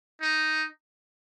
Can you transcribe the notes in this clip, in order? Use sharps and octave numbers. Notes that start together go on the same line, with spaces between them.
D#4